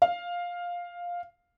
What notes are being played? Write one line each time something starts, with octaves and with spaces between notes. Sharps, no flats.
F5